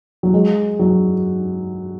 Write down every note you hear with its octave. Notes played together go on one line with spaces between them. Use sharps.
F#3
G#3
F#3